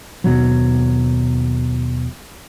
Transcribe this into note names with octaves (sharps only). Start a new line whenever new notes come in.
D#2 B2 F#3